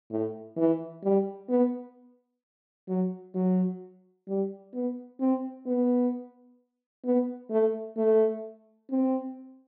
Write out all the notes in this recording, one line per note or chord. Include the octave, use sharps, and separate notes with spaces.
A2
E3
G3
B3
F#3
F#3
G3
B3
C4
B3
B3
A3
A3
C4